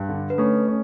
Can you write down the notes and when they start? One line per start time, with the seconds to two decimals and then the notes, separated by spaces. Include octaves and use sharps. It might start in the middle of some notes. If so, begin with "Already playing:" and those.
Already playing: G2
0.09 D3
0.30 B4
0.38 A3 C#4 A4
0.68 C#4